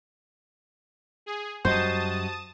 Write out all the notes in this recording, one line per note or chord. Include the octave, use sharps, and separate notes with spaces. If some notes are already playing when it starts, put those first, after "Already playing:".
G#4
F#2 G3 F#4 C5 D#5 A5 D#6 A6